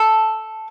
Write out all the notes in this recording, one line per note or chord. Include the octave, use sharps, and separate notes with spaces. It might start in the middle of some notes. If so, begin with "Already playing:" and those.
Already playing: A4